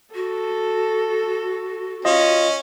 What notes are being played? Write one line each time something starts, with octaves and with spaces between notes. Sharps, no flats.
F#4 A4
C#4 F4 D#5